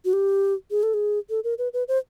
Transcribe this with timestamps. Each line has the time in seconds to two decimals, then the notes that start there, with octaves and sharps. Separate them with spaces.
0.05 F#4
0.13 G4
0.71 G#4
0.83 A4
0.94 G#4
1.30 A4
1.44 A#4
1.58 B4
1.73 B4
1.88 C5